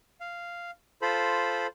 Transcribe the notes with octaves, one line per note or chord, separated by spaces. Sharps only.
F5
F4 A4 C5 B5